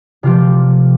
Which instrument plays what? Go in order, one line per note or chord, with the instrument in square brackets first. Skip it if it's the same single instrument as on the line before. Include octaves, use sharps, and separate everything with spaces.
[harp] C3 F3 F4 G4